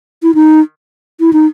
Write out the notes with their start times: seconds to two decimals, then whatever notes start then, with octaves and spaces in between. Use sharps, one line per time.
0.23 E4
0.35 D#4
1.20 E4
1.33 D#4